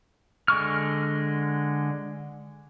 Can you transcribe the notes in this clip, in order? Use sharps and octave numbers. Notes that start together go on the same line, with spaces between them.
D3 G#3 C#6 F6